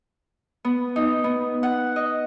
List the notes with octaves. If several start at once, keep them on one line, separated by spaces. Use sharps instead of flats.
B3
D#4
B3
F#5
D#5